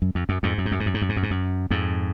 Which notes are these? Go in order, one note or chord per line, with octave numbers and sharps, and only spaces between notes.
F#2
F2
F#2
F2 G#2
F#2
G#2
F#2
G#2
F#2
G#2
F#2
G#2
F#2
G#2
F#2
F2 G#2